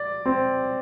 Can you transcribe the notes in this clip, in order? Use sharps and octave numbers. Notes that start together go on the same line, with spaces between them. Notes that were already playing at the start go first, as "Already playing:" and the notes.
Already playing: D5
C4